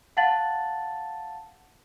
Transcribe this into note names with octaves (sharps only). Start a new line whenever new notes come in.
F5 F#5 A5 A6 F#7